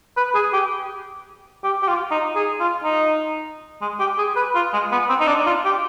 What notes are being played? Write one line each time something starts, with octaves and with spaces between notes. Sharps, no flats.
B4
G#4
G4
G4
G4
F4
D#4
G#4
F4
D#4
G#3
G4
G#4
B4
F4
G#3
B3
C4
D#4
D4
F4
G4